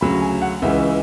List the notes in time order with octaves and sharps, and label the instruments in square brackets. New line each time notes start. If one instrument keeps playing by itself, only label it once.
[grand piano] D2 C#3 F#3 B5
G#5
F#5
C#2 C#3 E3 E5